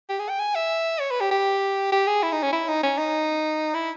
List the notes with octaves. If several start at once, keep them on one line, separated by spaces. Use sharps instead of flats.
G4
G#4
G5
G#5
E5
C#5
B4
G4
G4
G4
G#4
E4
D#4
C#4
E4
D#4
C#4
D#4
E4